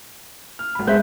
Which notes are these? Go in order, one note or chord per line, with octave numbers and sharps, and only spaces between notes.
F6
G#1 B5
G#3 C5 E5 F#6 G6